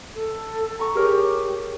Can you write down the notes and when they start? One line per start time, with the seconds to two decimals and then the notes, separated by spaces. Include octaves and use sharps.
0.16 A4
0.79 A#5 C#6
0.95 G4 G#4 A#4 C#5